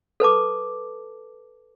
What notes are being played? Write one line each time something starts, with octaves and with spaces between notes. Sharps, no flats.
A4 B4 A5 D6